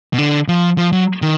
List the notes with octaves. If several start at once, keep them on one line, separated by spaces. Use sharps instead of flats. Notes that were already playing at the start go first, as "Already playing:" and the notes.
B2
D3
F3
F3
F#3
D#3